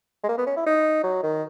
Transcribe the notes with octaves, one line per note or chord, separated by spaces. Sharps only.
G#3
A#3
B3
C#4
E4
D#4
F#3
D#3